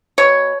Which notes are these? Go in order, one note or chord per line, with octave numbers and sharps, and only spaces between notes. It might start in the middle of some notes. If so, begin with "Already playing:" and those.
B2 C#5